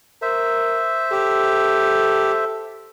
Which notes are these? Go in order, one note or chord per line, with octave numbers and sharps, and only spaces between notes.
A#4 C5 E5
G4 A4